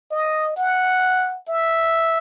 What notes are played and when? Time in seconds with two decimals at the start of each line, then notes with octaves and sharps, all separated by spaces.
0.12 D#5
0.57 F#5
1.49 E5